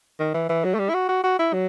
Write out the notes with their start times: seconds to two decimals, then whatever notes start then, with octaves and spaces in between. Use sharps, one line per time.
0.19 D#3
0.34 E3
0.49 E3
0.64 F#3
0.74 A3
0.79 G3
0.89 E4
0.94 F#4
1.09 F#4
1.24 F#4
1.39 E4
1.53 F#3